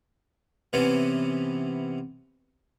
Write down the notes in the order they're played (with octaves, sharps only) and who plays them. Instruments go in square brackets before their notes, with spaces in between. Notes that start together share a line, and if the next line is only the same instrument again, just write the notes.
[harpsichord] C3 E3 B3 C#4